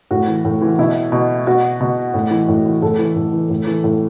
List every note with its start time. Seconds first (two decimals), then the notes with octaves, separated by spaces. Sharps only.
0.11 A2 F#4
0.28 E3
0.45 A2
0.61 E3
0.79 B2 E4
1.12 B2
1.47 B2 F#4
1.81 B2
2.14 A2
2.31 E3
2.48 A2
2.66 E3
2.82 A2 A4
2.99 E3
3.16 A2
3.33 E3
3.50 A2
3.67 E3
3.84 A2